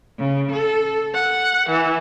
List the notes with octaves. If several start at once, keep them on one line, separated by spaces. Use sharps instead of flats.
C#3
A4
F#5
E3